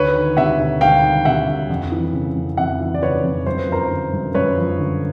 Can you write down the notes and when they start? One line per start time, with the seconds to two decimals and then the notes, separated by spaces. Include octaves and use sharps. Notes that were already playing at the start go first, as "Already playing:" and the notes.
Already playing: D2 B4 C#5
0.15 D#3
0.37 C3 E5 F#5
0.59 D2
0.81 D2 F5 G5
1.03 D#3
1.25 C3 E5 F#5
1.47 D2
1.69 F2
1.92 E3
2.13 C#3
2.36 F2
2.57 F2 E5 F#5
2.80 E3
2.94 D5
3.02 C#3 B4 C#5
3.24 F2
3.47 F#2 C5
3.59 B4
3.69 F3 A#4 C5
3.90 D3
4.13 F#2
4.34 F#2 B4 C#5
4.57 F3
4.79 D3